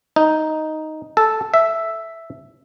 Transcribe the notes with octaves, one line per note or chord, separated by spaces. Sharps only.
D#4
A4
E5